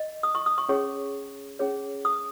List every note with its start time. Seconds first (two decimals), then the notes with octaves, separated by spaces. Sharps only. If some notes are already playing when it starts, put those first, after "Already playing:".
Already playing: D#5
0.23 D#6
0.35 C#6
0.46 D#6
0.58 C#6
0.69 C#4 G#4 C#5 C#6
1.59 C#4 G#4 C#5
2.05 D#6